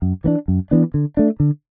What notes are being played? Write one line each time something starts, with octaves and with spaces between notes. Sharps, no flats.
F#2
E3 B3 D4
F#2
E3 B3 D4
D3
A3 D4
D3